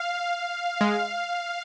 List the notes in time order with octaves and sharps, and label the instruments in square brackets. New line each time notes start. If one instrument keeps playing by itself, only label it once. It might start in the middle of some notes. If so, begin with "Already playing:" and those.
Already playing: [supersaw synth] F5
F5
[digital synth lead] G#3